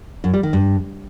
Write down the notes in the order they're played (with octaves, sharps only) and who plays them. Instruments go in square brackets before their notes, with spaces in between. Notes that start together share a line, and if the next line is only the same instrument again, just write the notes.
[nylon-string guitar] F#2
G3
D#3
G2